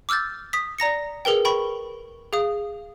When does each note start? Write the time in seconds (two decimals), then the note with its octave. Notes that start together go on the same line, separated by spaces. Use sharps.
0.09 D6 E6 F6 G6 A6
0.53 D#6 B6
0.78 D5 A#5 A#6 C#7
1.25 G#4 A#4 B4 G5
1.45 G5 B5 C#6
2.33 G#4 F5 D#6